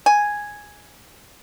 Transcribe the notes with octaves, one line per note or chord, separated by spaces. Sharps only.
G#5